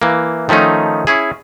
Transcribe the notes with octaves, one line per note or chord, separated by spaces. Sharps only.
E3 A#3
D#3 F3 A3 C#4 D#4
C#4 E4 G#4